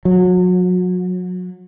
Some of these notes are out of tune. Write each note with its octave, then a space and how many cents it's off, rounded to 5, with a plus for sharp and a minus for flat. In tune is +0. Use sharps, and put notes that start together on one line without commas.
F#3 -30